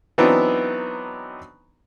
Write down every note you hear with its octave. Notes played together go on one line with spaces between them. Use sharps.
E3 F#3 B3 C4 D4 D#4